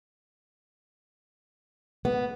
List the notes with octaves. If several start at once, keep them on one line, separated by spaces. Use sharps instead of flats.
B3